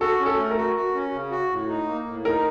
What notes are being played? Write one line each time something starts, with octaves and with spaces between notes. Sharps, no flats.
F#4 A4
C#4
A4
A3
A#4
F#4
F#4
C#4
C#3
F#4
A2
D#4
A#3
A2
D#4 A#4